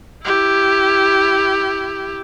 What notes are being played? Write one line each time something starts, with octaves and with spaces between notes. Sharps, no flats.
E4 G4